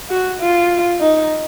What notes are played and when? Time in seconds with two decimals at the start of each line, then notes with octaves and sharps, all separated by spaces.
0.10 F#4
0.40 F4
1.00 D#4